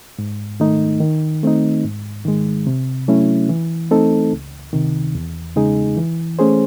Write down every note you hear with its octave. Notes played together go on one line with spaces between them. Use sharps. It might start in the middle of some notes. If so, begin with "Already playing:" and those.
G#2
D#3 A3 D#4
D#3
A3 C4 D#4
G#2
D#3 G#3
C3
F#3 A3 C#4 E4
E3
A3 C4 D#4 A4
C#2
C3 D#3
E2
C#3 G#3 D#4 G#4
E3
A3 C#4 G#4 C5